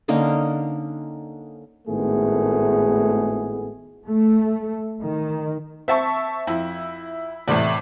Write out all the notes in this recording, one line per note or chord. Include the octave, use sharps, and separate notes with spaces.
D3 A#3 C#4 D#4
G#1 A2 D#3 A3 B3 G#4
A3
D#3
C4 E5 A5 C#6
F2 E4
E2 A2 C3 A3 D5